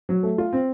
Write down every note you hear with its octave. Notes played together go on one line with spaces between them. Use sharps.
F#3
A3
F4
C4